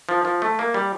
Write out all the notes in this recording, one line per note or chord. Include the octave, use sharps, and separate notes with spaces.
F3
F3
A3
A#3
G3